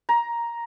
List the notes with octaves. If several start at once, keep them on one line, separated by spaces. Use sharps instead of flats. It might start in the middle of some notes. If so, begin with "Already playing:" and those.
A#5